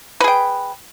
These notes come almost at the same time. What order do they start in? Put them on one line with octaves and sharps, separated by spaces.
B4 G#4 G5